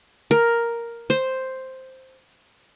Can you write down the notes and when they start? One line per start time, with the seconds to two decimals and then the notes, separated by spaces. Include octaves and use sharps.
0.31 A#4
1.10 C5